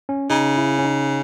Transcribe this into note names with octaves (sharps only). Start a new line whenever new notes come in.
C#4
C#3 D#4
E4
C#4
D#4